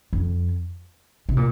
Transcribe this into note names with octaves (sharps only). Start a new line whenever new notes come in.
F2
C3
A#2